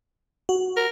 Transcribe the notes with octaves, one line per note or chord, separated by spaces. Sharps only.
F#4
A#4